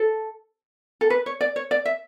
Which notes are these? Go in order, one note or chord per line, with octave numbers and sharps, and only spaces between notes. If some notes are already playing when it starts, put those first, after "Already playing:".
Already playing: A4
A4
B4
C#5
D5
C#5
D5
E5